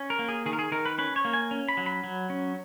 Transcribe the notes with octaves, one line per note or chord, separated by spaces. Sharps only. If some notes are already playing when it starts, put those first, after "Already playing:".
Already playing: C#4
A#4
A#3
G#4
D#3 G#4
A#4
G#4
D#3 A#4
B4
C#4 B4
C#5
A#3
G#5
C#4
B5
F#3
B5
F#3
C#4